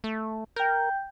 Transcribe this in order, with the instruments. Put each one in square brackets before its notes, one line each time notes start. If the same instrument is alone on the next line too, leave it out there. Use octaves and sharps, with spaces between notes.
[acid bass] A3
[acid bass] A#4 [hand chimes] G5 G6